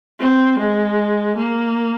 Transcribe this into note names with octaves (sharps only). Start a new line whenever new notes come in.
C4
G#3
A#3